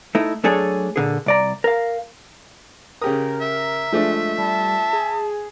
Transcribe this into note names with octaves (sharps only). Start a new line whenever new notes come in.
A3 D#4 E4
F#3 A3 D4 G#4 A4 C#5
A#2 D3 G#4
C2 D5 A#5
A#4 F5
C#3 G4 A#4 D#6
E5
F3 G#3 A3 D4
G3 A5
G#4